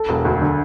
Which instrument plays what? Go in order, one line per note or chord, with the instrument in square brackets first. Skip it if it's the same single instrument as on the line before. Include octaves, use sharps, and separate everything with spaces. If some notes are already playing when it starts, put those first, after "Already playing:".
Already playing: [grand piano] A4
[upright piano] E1
D2
D3